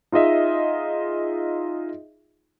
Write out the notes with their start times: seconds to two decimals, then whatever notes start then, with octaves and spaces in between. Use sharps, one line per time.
0.12 D#4 F4 G#4 D#5 E5